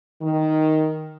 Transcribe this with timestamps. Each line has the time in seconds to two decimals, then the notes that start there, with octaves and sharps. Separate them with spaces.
0.22 D#3